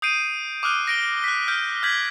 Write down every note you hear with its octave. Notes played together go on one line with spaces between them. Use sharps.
D#6 G6 C7 D7 D#7
D6 D#6 F6 F#6 D#7
A#6 D7 G7
F#6 B6
F6 G6 D7
F6 G6 G#6 B6 F#7